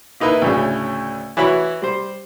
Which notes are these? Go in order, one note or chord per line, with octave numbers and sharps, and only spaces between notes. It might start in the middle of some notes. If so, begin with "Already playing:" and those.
A#3 D#4 E4 B4
D2 A2 C#3
E3 E4 F#4 C#5 B5
G3 C5